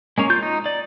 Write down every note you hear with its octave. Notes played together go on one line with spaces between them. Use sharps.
G#3 A#3 C#4
F4 G6
D#4
D5